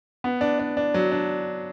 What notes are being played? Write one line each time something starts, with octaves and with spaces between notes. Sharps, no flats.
B3
D4
D4
D4
F#3
D4